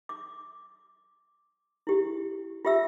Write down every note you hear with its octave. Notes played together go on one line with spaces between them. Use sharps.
D6
E4 G4
F4 G4 E5 E6